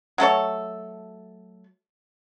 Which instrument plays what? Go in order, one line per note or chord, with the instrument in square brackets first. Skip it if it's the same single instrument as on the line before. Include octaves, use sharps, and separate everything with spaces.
[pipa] F#3 A3 A4 C#5